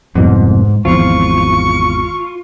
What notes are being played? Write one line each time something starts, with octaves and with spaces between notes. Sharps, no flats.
F1 C2 G#2 B2
G#1 E2 F3 F4 C#6